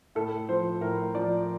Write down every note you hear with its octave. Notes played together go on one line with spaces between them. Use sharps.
A2 A4
F3 C5
A2 A#4
F3 D5